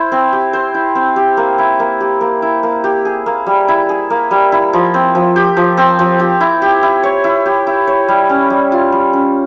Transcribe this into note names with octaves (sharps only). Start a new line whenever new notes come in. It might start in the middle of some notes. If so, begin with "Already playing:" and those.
Already playing: E4 C5
C4
G4
C5
E4
C4
G4
A#3
E4
A#3
G4
A#3
E4
A#3
G4
G#4
A#3
G3
E4
G#4
A#3
G3
E4
F3
C4
F3
G4
F3
C4
F3
G4
E4
G4
E4
C#5
E4
G4
E4
C#5
G3
C#4
G3
F4
G3
C#4